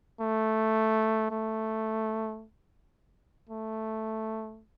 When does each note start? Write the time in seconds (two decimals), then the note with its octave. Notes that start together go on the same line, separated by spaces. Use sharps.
0.21 A3
1.31 A3
3.50 A3